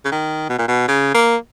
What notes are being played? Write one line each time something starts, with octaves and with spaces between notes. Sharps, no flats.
C#3
D#3
B2
A#2
B2
C#3
A#3